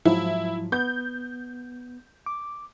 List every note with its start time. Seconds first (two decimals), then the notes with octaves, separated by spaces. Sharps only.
0.05 G#2 F3 F#3 E4
0.72 B3 G6
2.26 D6